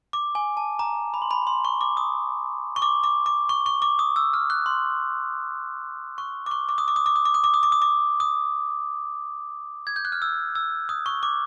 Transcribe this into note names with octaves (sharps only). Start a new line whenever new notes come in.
D6
G#5
A5
A#5
B5
C6
B5
C6
C#6
D6
D#6
C#6
D6
D6
D6
C#6
C#6
D6
D#6
E6
F6
F#6
C6
C#6
D6
C#6
D6
D#6
D6
D#6
D6
D#6
D6
D#6
D6
D#6
D6
D#6
D6
D#6
G#6
G6
F#6
F6
E6
E6
D#6
C#6
D6